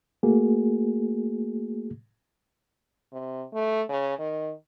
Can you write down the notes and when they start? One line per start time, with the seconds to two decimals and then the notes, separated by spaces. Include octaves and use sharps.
0.23 A3 A#3 F#4 G#4
3.12 C3
3.53 A3
3.89 C#3
4.18 D#3